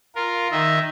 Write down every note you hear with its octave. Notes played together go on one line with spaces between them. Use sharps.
F4 A#4
D#3 D#5 E5